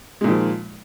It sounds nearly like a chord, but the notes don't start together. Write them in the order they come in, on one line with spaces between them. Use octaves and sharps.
G#3 A#2 D#3 F3